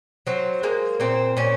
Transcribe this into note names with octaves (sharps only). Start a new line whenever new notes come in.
F#3 C4
G#3 A#3
A#2 C4
A#2 C#4